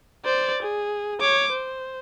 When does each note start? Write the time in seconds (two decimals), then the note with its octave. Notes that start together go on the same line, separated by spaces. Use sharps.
0.25 C5 D5
0.62 G#4
1.20 C#5 D6
1.52 C5